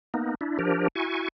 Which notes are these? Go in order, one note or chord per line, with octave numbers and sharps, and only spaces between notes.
A#3 B3 D#4
D4 E4
F3 D4 G4 A#4
E4 F#4 G#5 C#6